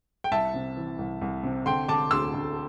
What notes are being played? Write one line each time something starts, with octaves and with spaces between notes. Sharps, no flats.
G5
C2 E5 A5
C3
E3
C2
C2
C3
D3 G5 C6
D3 A5 D6
D2 C6 E6
D2